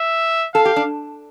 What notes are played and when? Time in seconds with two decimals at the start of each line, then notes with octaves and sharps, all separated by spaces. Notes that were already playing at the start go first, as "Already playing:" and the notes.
Already playing: E5
0.54 A4 F5
0.65 G4
0.76 D4